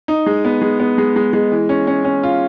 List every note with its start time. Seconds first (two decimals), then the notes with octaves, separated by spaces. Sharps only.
0.08 D#4
0.27 G#3
0.45 B3
0.62 G#3
0.80 B3
0.98 G#3
1.16 G#3
1.33 G#3
1.52 E3
1.69 C#4
1.87 C#4
2.05 C#4
2.23 F4